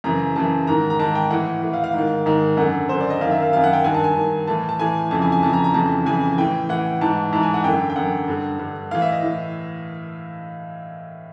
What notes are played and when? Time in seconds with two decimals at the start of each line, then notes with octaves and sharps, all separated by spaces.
0.04 F#2 C#3 E3 A#5
0.36 F#2 C#3 E3 A5
0.67 G#2 D#3 A#5
0.90 A#5
0.99 G#2 D#3 A5
1.15 G5
1.30 A2 E3 F#5
1.63 A2 E3
1.73 F5
1.84 F5
1.94 G#2 D#3
2.26 G#2 D#3
2.57 F#2 D3 F#5
2.89 F#2 D3 C5
3.00 D5
3.10 D#5
3.21 F#2 D#3 F5
3.31 E5
3.42 F5
3.52 F#2 D#3 F5
3.64 F#5
3.73 G5
3.84 G2 D#3 G#5
3.94 A5
4.04 G#5
4.16 G2 D#3
4.47 A2 E3 A5
4.69 A5
4.79 A2 E3 G#5
5.11 F2 C#3 E3 A5
5.22 G#5
5.32 G#5
5.43 F2 C#3 E3 A5
5.53 A#5
5.64 A#5
5.74 F2 C#3 E3 A5
6.05 F2 C#3 E3 G#5
6.38 A2 E3 G5
6.69 A2 E3 F#5
7.01 G#2 E3 A5
7.32 G#2 E3 A5
7.43 G#5
7.54 F#5
7.64 F#2 D3 G5
7.90 G5
7.96 F#2 D3 F#5
8.28 G2 D3
8.59 G2 D3
8.91 A2 E3 F5
9.02 E5
9.12 D#5
9.23 A2 E3